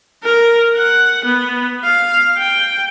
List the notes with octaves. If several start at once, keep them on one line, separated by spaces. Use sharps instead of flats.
A#4
F#5
B3
F5
G5